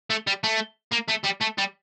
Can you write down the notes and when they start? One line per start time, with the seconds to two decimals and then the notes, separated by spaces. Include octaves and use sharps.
0.10 A3
0.27 G3
0.44 A3
0.93 A#3
1.09 A3
1.25 G3
1.42 A3
1.58 G3